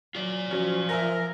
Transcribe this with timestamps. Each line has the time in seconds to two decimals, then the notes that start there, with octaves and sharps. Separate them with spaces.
0.15 F#3 F4 D5
0.51 F3 F#3 C#4
0.89 A#4 E5 G#5 A#6